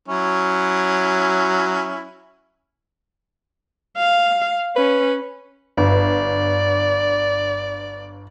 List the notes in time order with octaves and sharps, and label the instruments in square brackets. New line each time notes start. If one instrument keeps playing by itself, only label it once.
[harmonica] F#3 C#4 E4
[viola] F5
[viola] C#4 [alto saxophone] B4
[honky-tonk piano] G1 [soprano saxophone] D5